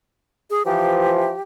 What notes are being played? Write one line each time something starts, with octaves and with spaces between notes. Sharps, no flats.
G#4
E3 F3 G4